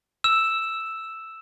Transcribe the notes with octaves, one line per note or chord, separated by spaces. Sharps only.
E6 E7